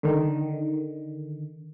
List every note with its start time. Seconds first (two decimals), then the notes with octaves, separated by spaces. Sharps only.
0.03 D3 D#3